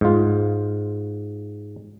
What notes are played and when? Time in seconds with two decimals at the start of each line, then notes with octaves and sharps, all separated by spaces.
0.01 G#2 F4